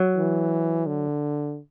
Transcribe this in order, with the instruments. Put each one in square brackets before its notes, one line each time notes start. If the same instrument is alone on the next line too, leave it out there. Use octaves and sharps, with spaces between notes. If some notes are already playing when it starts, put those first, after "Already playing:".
Already playing: [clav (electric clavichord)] F#3
[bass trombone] E3
D3